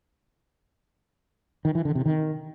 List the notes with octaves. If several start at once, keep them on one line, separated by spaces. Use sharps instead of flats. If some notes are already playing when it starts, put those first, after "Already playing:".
D#3
E3
D3
C3
D#3